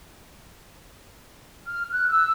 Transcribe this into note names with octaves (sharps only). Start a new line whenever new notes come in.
F6
F#6
E6